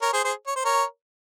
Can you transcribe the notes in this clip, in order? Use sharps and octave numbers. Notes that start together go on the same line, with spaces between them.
A#4 C#5
G#4 C5
G#4 C5
C#5
C5
A#4 C#5